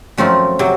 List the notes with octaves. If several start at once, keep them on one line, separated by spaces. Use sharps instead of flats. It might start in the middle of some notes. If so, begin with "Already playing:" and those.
F#2 F3 A3 C4 D#4
C3 F#3